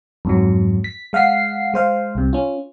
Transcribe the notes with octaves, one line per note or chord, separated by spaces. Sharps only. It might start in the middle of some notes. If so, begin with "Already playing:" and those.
F2 G#2 F#3
B6
G#3 F5 F#5 B6 C7
G#3 C5 F5
C2 C3
C#4 F4